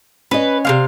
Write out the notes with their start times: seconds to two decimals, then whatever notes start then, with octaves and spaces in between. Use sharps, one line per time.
0.31 C#4 B4 D#5
0.65 C3 B3 F5